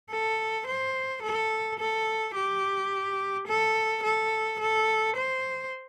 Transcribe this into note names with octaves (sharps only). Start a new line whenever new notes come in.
A4
C5
A4
A4
G4
A4
A4
A4
C5